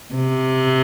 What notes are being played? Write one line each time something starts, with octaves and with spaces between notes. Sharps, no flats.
C3